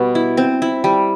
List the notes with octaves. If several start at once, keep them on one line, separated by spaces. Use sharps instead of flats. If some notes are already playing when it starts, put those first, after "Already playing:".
Already playing: B2 G3
E4
C4
E4
G3